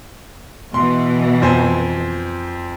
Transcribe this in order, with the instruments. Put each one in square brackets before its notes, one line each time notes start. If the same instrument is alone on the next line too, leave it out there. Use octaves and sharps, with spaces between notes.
[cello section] B2 E3 [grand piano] C6
[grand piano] F2 C5 G#5